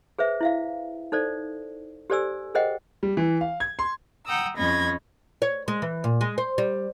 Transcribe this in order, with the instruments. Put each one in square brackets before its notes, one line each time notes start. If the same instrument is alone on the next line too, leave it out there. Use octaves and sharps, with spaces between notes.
[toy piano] G#4 B4 C5 E5
E4 E5 F5
D#4 A4 C5 D5
G4 A4 C5 D5 G#5 E6
G#4 A#4 C5 D#5 F#5 G5
[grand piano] G3
E3
F5
G#6
C6
[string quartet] F#5 G5 A#5 D#6 E6
F2 C#4 D#5 B5 G#6 A#6
[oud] C#5
G#3
E3
A#2
G#3
C5
G3